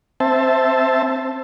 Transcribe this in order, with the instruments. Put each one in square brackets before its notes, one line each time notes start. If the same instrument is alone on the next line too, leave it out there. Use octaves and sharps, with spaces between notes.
[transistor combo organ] C4 C5 E5 A5